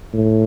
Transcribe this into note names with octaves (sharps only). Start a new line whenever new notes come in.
A2